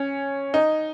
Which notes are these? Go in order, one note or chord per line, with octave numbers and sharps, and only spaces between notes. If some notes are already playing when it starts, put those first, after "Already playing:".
Already playing: C#4
D#4